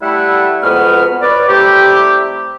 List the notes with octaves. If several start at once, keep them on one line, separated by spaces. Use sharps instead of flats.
G3 A3 E4 F#5
F2 G#3 B3 F#4 B4 F6
B4 C#5 D5
C3 G3 A3 E4 G4